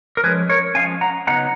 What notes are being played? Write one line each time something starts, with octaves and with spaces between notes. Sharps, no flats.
A#4
F3 G#3 C#4 G#4 B4
A#4 C#5
F3 G#3 C#4 F5 G#5
F#5 A#5
C#3 F#3 B3 D#4 F#5 A#5